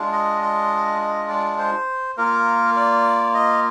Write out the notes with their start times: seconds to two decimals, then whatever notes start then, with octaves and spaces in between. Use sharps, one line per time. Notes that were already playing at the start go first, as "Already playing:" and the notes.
Already playing: G#3 D4 F4
0.12 D#5
0.42 D#5
1.00 D#5
1.29 D5
1.59 C5
2.18 A#3 F4 A#4
2.76 D5
3.34 D#5